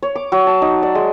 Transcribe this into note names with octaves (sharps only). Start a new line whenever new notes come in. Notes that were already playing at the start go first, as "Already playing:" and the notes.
C#5
D6
F#3
A5
D#4
D5
G#3